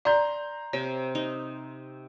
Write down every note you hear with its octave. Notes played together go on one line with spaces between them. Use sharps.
D5 A#5 C6 G6
C3 C#5
D#4